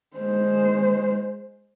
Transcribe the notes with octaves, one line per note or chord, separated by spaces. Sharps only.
G#3 C5